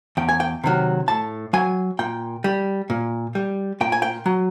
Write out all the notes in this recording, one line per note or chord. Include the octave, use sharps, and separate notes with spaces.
E2 G5
G#5
G5
C3 D#3 F#3
A2 A5
F#3 G#5
A#2 G5
G3
A#2
G3
A#2 G5
G#5
G5
F#3